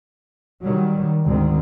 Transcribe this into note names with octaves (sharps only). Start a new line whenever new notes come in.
D#3 F#3 G3
D2 G#2 D#3 C4